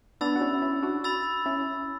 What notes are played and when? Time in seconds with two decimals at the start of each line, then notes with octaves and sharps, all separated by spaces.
0.21 B3 D4 B5 E6 A6
0.35 F#4
0.41 C#4 E4
0.62 C#4 E4
0.83 D4 F#4
1.04 B5 E6 A6
1.46 C#4 E4